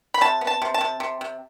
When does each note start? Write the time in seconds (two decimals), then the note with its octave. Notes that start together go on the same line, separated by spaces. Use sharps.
0.14 B5
0.21 C3 A5
0.41 B3
0.47 A5
0.62 C3
0.74 A5
0.81 C3
1.00 C3
1.21 C3